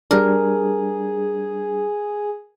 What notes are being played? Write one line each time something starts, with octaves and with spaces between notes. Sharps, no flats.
G3 D4 G#4 A#4